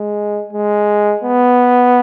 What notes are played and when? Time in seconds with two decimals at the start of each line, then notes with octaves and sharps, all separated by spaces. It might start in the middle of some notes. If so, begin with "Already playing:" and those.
Already playing: G#3
0.53 G#3
1.24 B3